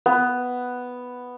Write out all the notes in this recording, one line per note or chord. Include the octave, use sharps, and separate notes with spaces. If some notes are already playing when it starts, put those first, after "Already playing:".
B3